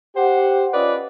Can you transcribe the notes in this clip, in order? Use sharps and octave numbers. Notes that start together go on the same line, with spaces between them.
G4 C5 F#5
C#4 F4 B4 D5 D#5 F#5